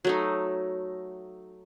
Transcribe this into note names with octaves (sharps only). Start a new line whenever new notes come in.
F#3 A3 D#4